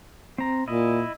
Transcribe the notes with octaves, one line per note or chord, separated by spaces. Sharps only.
C4 A#5
A#2 E4 D#5